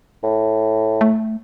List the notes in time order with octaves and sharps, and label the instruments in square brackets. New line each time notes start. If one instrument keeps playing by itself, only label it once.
[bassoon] A2
[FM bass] A3